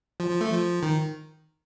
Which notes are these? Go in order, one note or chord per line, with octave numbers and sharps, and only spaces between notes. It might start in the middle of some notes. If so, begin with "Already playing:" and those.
F3
F3
A3
F3
D#3